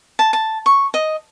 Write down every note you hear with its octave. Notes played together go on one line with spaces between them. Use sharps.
A5
A5
C#6
D#5